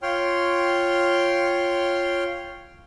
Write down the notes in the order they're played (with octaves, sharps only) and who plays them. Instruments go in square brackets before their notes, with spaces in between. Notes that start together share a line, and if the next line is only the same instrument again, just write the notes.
[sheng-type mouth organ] F4 C#5 G5 C6 F6